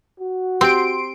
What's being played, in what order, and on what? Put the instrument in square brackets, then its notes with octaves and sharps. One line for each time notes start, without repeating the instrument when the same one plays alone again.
[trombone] F#4
[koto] C4 [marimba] G4 [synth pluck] C6 D7